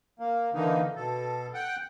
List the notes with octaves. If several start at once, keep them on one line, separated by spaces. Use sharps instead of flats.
A#3
D3 E3 A#3 D#4
B2 A4
F#5 G5